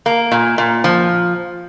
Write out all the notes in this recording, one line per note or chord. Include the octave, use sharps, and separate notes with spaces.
A#3
A#2
A#2
F3